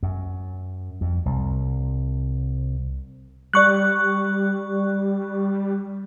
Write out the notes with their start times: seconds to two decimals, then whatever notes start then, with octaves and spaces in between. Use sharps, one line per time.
0.03 F#2
1.01 F2
1.26 C2
3.53 G3 D5 C#6 F#6